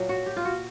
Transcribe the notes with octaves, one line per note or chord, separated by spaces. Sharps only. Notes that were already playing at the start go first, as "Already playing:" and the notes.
Already playing: A#2 F#3
F#4
G4
F4
F#4